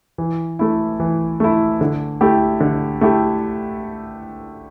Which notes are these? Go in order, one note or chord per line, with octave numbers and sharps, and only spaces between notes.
E3
A3 E4
E3
A3 E4
D3
A3 E4 G4
D3
A3 E4 G4